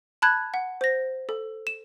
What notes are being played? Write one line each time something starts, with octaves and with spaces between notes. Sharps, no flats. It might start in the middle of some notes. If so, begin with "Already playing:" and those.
A5 B5 F#6 G#6
F#5
C5 A#6
A4
E7